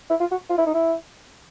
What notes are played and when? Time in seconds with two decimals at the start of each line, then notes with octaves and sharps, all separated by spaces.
0.10 E4
0.20 F4
0.31 F#4
0.50 F4
0.58 E4
0.66 D#4
0.74 E4